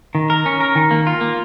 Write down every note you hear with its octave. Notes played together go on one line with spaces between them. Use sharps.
D#3
A#4
C#4
A#4
D#3
A#3
F4
A#3